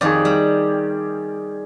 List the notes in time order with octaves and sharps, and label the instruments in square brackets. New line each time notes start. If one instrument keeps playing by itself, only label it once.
[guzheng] F2 D#3 [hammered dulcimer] G#4 D5
[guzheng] G3